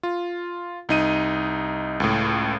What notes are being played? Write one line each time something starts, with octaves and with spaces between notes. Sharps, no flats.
F4
C2 D#4 D#7
C#2 A2